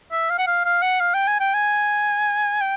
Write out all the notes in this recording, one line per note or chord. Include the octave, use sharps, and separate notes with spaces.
E5
F5
F#5
F5
F5
F#5
F5
G5
G#5
G5
G#5
G5